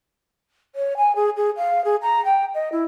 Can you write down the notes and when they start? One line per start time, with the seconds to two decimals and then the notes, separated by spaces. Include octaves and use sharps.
0.75 C#5
0.97 G#5
1.16 G#4
1.37 G#4
1.57 F5
1.85 G#4
2.02 A#5
2.25 G5
2.54 D#5
2.72 E4